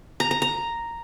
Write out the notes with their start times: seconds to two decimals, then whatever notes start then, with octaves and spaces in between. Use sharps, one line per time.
0.20 A#5
0.31 A#5
0.42 A#5